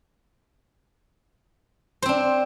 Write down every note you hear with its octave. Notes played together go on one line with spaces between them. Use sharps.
C4 D4 C5